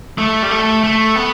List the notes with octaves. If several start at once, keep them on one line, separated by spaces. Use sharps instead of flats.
A3
G3
A3
A3
B3